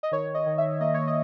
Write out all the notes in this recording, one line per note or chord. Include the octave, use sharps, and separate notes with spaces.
D#5
D#3 C#5
D#5
D#3
E5
A#3 D#5
C#5
D#5